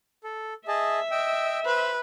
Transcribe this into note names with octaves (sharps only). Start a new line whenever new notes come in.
A4
G#4 D#5 E5 A5
D#5 G5 E6
B4 C5